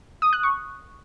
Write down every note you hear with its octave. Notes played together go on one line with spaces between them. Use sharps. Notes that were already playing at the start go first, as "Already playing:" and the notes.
D#6
F#6
C#6